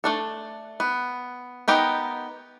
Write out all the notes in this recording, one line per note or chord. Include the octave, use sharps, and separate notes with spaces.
A3 D4 A4
B3
B3 D#4 G4 A#4